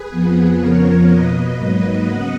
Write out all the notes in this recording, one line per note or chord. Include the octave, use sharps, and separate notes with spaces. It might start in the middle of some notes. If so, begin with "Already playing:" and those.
Already playing: G#4 B4
F2 F3 B3
F2 C#3 F3 B3 A#4 C#5
B2 A#3 B4 D#5
G#2 F#3 A#3
C#3 B3 D#5 F#5